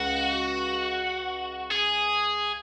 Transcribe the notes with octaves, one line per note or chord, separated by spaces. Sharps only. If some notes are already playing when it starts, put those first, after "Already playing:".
Already playing: C#2 F#4
G#4